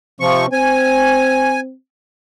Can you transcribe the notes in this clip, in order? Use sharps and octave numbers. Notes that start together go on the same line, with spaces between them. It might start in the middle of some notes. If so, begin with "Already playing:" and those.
C3 F3 C4 C#6
C4 G#5